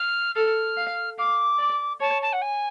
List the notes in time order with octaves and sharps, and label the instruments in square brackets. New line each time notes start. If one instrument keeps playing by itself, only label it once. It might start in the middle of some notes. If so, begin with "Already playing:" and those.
Already playing: [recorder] F6
[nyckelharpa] A4 [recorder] F6
[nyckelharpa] F5
[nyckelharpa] F5 [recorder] D6
[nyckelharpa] D5
[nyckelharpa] C#5 [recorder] A5
[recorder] A5
F#5
G#5